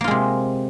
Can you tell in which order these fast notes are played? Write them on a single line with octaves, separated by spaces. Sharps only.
A#3 F4 G#3 C3